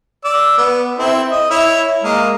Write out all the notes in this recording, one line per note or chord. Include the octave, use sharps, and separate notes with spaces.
D5 E6
B3
C4 E4 A4
D#5
E4 C#5 E5
G#3 A#3 A#4